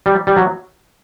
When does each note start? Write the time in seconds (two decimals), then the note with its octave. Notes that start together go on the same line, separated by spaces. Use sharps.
0.06 G3
0.27 G3
0.36 F#3